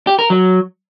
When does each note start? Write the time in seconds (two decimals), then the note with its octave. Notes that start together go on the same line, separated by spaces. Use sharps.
0.07 G4
0.19 A#4
0.30 F#3